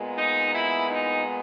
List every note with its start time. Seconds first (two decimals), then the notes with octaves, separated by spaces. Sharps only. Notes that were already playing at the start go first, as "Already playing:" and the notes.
Already playing: A#2 G#3 B3
0.18 D#4
0.54 E4
0.90 D#4